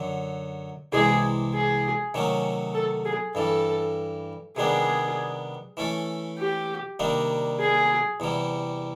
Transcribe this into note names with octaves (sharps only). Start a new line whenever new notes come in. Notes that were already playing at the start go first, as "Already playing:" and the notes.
Already playing: F#2 D3 F#3
C2 C3 E3 G#3 G#4
G#4
C3 D#3 F#3 A3 C#4
A4
G#4
G2 E3 G3 A4
C3 D#3 G3 B3 D4 G#4
E3 A3 C#4 E4 A4
G4
C3 D#3 G3 A#3 D4
G#4
E2 C3 E3 G3